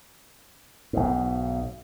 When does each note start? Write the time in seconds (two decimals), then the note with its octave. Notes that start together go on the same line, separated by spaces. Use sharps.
0.93 B1 G#2